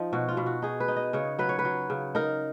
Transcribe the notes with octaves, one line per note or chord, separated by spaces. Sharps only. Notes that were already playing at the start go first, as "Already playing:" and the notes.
Already playing: F3 D#4 D#5
B2 F#4
F4
B2
F#4
D#4 G#4
B4
D#4
D#5
C#3 C#5
F#3 B4
C#5
B4
F#3
C#3
D#4 A#4